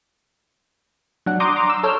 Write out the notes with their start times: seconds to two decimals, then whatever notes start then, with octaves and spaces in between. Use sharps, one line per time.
1.26 F#3 D4 F#5
1.40 A#5 C6 D6 D#6 G6
1.56 A#5 C6 D6
1.70 E6
1.83 A4 C#5 E6 F6 G6